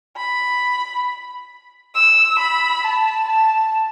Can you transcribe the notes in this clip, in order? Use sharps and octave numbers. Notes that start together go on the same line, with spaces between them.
B5
E6
B5
A5
A5